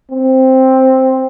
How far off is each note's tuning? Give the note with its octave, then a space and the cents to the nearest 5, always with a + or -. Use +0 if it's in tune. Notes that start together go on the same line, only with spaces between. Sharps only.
C4 +5